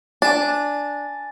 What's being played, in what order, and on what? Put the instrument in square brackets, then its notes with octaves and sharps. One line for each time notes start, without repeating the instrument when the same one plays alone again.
[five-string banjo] D4 [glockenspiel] G#5 A6